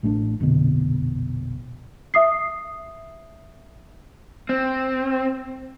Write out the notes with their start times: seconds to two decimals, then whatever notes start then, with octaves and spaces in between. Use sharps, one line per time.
0.03 A1 A3 B3 D4
0.40 F1 A#1 B2 D3
2.14 E5 D#6 C7
4.49 C4